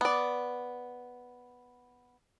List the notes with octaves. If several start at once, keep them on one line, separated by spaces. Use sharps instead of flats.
B3 D5